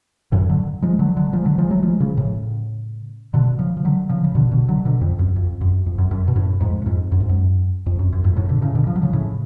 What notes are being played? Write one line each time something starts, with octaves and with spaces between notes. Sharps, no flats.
F#2 A2
D3 F#3
F3 G#3
D3 F#3
D3 F#3
F3 G#3
D3 F#3
F3 G#3
F#3 A3
F3 G#3
C#3 F3
A2 C#3
B2 D3
C#3 F3
F3
D3 F#3
C#3 F3
C#3
B2 D3
B2 D3
D3 F#3
B2 D3
F2
F#2
F2
F#2
F2
F#2
F#2
B2
F#2 A2
F2 G#2
A2
F2 G#2
F#2
G#2
F#2
F2
F#2
F#2
F2 G#2
F#2 A2
B2 D3
A2 C#3
B2 D3
F3
F#3
C#3 F3
A2 C#3